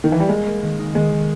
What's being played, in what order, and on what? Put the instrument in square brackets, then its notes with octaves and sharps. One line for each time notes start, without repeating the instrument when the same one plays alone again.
[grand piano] D#3
E3
G3
[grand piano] G#3 [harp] A#3
[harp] A#3
D#3
D#4
[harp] D#3 [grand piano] G#3
[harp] D#3